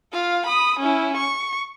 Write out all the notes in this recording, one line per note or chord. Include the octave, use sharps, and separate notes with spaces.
F4 F5
B5 D#6
C#4 E4
C#6